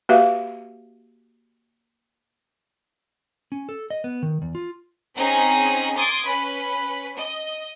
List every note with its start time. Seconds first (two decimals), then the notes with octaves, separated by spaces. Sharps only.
0.09 A#3 F#4 G4 B4 E5 F5
3.52 C#4
3.69 A4
3.90 D#5
4.04 B3
4.22 D#3
4.42 E2
4.55 F4
5.15 C4 C#4 D#4 G#4
5.97 C6 D6 D#6 G#6 A6
6.26 C#4 B4
7.17 D#5